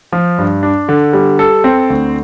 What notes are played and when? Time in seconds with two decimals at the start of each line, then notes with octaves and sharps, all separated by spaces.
0.12 F3
0.38 G2
0.63 D4
0.89 D3
1.13 G3
1.39 A4
1.64 C4
1.90 D2